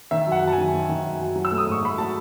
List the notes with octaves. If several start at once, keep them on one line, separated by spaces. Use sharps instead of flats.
D#3 E5
F#2
F#5
F#2
A5
G#5
D#3
D#3
D#3
F#2
F#2
F#3
E6
A3
D#6
G#2 C#6
A3 B5
F#3 A5